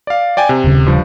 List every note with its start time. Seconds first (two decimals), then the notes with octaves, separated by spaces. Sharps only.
0.07 D5 F5
0.37 D5 G5 G#5
0.49 C3
0.64 D#1 C#3
0.86 G2 F3